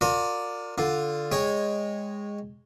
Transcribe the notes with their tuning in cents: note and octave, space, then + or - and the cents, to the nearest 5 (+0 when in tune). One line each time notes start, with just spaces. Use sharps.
F4 +40 A#4 -25 D5 +0
D3 +0 F4 +0
G#3 -15 C#5 -5 G5 +0